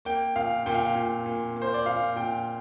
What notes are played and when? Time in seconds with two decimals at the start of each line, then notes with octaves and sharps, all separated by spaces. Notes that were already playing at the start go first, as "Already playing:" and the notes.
0.05 A#3 G5
0.36 A#2 F5
0.66 A#2 G5
0.75 F5
0.82 G5
0.96 A#2
1.26 A#2
1.56 A#3
1.62 C5
1.74 D5
1.86 A#2 F5
2.16 A#2 G5